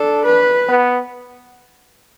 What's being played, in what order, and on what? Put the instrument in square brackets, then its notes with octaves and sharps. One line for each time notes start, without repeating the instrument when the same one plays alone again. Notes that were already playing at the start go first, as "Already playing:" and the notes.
Already playing: [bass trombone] D4 [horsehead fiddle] A4
[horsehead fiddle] B4
[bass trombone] B3